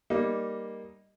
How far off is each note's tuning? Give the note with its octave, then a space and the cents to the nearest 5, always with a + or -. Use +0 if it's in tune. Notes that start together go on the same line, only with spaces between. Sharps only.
G3 +0 A#3 +0 D#4 +0